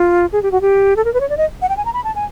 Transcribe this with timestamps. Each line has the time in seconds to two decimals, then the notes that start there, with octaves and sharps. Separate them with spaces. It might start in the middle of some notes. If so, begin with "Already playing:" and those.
Already playing: F4
0.32 G#4
0.43 G4
0.52 F#4
0.61 G4
0.96 A4
1.05 A#4
1.14 B4
1.21 C#5
1.29 D5
1.37 D#5
1.62 F#5
1.69 G5
1.77 G#5
1.85 A#5
1.94 B5
2.04 A5
2.15 G#5